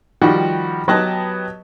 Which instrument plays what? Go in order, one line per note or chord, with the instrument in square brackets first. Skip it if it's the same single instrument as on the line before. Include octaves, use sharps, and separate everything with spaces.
[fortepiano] D#3 F3 G3 F#4 G4
F#3 B3 G4 D#5 A5 F#6